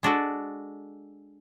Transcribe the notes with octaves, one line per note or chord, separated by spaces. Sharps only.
G#3 D4 F#4 A4